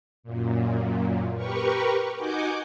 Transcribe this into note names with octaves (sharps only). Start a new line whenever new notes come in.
F#2 A#2
G4 A#4 B4 C#6
D#4 F#4 F#5 G#5 D6 G6